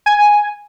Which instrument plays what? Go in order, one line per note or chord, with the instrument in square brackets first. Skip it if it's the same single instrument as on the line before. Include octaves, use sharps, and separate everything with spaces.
[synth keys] G#5